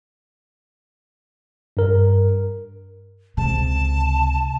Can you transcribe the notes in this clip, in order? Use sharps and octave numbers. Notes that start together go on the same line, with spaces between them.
G2 A#4
C#2 C3 A5